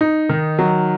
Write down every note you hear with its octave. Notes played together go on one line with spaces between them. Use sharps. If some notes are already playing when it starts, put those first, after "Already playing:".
D#4
D#3
F#3